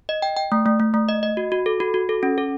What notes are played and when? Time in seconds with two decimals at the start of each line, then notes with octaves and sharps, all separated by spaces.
0.09 D#5
0.22 G5
0.37 G5
0.52 A3
0.66 A3
0.80 A3
0.94 A3
1.09 D#5
1.23 D#5
1.37 F#4
1.52 F#4
1.66 A4
1.80 F#4
1.94 F#4
2.09 A4
2.23 C#4
2.38 A4